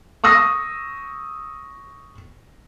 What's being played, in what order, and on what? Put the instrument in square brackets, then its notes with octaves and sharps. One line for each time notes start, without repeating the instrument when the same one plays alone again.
[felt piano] C#6 D#6 E6 A#6